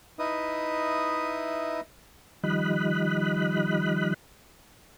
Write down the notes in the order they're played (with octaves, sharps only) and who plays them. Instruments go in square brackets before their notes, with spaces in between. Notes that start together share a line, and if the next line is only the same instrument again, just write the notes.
[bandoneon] D#4 E4 B4 D#5 E5 D#6
[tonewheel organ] D#3 F3 G3 D#5 B5 F#6